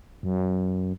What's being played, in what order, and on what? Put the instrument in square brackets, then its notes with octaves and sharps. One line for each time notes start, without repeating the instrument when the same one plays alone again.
[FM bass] F#2